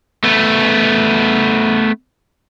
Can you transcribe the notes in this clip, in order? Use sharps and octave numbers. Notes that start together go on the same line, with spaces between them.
A3 B3